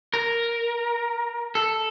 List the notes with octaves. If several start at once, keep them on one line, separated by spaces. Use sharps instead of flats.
A#4
A4